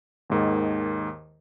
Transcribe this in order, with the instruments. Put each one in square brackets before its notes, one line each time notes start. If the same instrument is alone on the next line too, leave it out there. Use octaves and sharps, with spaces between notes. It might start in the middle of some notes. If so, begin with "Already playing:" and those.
[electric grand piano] D#2 G#2 D#3